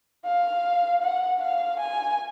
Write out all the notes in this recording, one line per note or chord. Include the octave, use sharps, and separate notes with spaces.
F5
F#5
F5
G#5